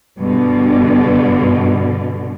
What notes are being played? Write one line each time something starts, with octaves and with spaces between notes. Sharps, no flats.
G2 B2 D3